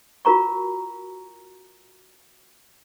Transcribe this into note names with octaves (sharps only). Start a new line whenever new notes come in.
F4 F#4 A#4 A#5 C#6